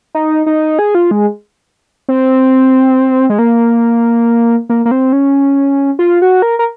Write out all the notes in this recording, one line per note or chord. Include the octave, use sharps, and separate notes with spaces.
D#4
D#4
G#4
F4
G#3
C4
G#3
A#3
A#3
A#3
C4
C#4
F4
F#4
A#4
A#4